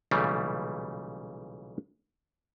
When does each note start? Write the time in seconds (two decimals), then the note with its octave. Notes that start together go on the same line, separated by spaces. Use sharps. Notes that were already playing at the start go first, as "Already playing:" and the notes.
0.11 B1 A#2 C#3 E3 G3 A3